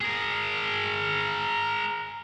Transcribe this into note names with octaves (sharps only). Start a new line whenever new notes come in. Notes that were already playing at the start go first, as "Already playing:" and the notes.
G#4 A#4